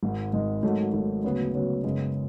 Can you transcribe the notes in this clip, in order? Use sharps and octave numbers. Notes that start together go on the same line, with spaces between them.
G#1 G#2 G#3
G#1 G#2 G#3
G#1 G#2 F#3 A3
G#1 G#2 F#3 A3
D2 C#3 F#3 B3
D2 C#3 F#3 B3
F#1 F#2 C#3 G#3 B3